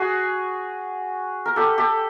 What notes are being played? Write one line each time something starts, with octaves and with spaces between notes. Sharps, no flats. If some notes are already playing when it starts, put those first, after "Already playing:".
Already playing: F#4 G#4
A#4
G4 A4
G4 A4